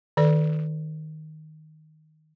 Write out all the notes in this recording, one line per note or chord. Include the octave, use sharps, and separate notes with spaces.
D#3 A4 D5